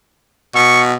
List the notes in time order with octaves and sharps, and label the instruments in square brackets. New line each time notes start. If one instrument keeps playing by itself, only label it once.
[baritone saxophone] B2 [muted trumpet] C#6